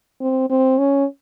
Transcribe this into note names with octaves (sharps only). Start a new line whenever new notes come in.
C4
C4
C#4